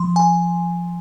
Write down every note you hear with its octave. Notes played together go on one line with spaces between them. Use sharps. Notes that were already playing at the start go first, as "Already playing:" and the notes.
Already playing: F3 C6
G#5